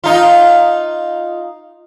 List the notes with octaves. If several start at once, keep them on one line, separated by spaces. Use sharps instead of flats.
D#4 F4